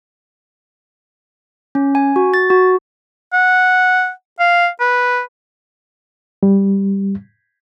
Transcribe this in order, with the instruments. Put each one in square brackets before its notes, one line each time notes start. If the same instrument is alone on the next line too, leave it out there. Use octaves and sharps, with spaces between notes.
[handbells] C#4
G#5
F#4
A6
F#4
[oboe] F#5
F5
B4
[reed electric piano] G3